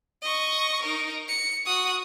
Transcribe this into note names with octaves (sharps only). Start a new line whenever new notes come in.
D#5 C#6
D#4 A#4
C#7
F#4 D#6